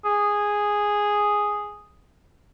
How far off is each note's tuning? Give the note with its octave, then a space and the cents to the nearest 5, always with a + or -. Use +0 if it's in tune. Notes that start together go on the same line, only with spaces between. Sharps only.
G#4 -5